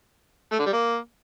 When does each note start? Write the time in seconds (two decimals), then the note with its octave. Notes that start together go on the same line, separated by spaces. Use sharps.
0.52 A3
0.59 D3
0.66 G3
0.73 A#3